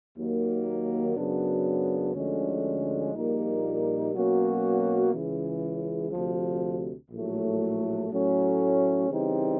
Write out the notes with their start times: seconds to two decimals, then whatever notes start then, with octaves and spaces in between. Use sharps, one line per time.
0.17 D#2 D#3 F#3 A#3
1.16 F#2 C#3 F#3 B3 D4
2.15 D2 D3 F3 G#3 C#4
3.14 A#1 A#2 G3 A#3 D#4
4.14 B2 F#3 A#3 C#4 F#4
5.12 C#2 C#3 E3
6.11 D2 C3 F3
7.11 A#1 A2 F#3 A3
8.10 A2 F#3 A3 C#4
9.10 C#3 E3 G3 C4 D#4